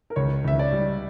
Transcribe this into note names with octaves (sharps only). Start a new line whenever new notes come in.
A#4
C#2 C#5
C#2 E5
D5
G3